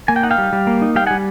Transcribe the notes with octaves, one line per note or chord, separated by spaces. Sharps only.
A#3 G#5
G5
D#4 F#5
F5 G5
G3
G3
A#3
D#4
G3 F5 G5
G3 F#5 G#5